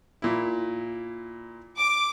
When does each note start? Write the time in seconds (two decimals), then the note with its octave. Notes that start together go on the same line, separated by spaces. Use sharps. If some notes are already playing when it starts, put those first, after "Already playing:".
0.22 A#2 E4
1.77 D6